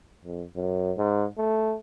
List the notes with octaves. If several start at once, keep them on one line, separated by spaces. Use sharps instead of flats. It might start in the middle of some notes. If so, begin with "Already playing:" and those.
F2
F#2
G#2
A3